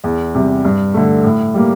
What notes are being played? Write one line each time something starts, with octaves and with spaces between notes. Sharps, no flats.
E2
C3 G3
G2
D3 A3
A2
G3 A#3